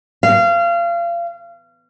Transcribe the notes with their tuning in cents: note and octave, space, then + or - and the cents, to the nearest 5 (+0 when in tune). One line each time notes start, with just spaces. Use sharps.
F5 -30